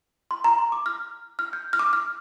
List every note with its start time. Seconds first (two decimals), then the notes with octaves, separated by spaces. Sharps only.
0.31 C6
0.44 A#5
0.58 C6
0.72 D6
0.86 F6
1.39 F6
1.53 G6
1.73 F6
1.79 D6
1.93 F6